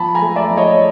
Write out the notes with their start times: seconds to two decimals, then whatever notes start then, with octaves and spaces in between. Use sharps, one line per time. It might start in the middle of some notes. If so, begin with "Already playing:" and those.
Already playing: F3 A5 B5
0.15 G#5 A#5
0.22 A3
0.36 D5 E5
0.50 F3
0.57 C#5 D#5